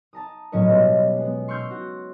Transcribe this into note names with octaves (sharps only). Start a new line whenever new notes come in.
A5 A#5 D#6
A2 F#3 C#4 C#5 D#5
B2 G3
G#3 B3
C6 C#6 E6 F6 G6 C7
F#4